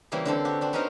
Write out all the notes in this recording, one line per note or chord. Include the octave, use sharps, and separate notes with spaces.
C#3 E3 G3 A#3 C4
D3 C4 A4 C5
F#4 G4
C4 D4 F#4
B3 C#4 D#4 F#4 A#4 C5